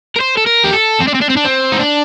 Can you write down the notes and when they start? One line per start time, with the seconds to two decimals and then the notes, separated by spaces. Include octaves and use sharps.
0.16 A#4
0.21 C5
0.37 A4
0.47 A#4
0.64 G4
0.73 A4
1.01 C4
1.08 D4
1.15 C4
1.22 D4
1.30 C4
1.37 D4
1.45 C4
1.72 D#4
1.79 D4